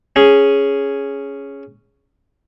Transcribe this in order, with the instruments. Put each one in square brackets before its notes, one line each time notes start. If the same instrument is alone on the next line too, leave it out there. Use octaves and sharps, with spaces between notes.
[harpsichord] C#4 G#4